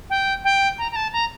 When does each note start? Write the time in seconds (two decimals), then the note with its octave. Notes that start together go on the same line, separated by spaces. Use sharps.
0.10 G5
0.44 G5
0.78 A#5
0.92 A#5
0.96 A5
1.13 A#5